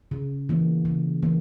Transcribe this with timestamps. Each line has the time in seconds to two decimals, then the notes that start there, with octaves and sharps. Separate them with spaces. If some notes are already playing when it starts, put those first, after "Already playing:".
0.11 C#3
0.49 E3 A#3
0.85 C#3
1.22 E3 A#3